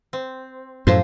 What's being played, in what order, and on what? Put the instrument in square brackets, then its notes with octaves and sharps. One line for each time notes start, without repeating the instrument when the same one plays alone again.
[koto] C4
[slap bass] F#2 A2 [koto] F3 C5